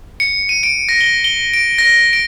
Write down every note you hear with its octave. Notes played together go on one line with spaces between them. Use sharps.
C#7
D#7
D7
A#6
G7
G7
D7
A#6
D7